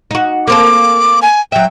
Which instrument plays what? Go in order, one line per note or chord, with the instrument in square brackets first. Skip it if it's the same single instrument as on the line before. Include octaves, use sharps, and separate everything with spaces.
[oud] D#4 F#4
[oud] A#3 C4 A4 [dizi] D6
[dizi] G#5
[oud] F#3 E5 [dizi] G5